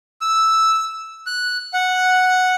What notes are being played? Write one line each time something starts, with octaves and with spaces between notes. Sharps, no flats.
E6
F#6
F#5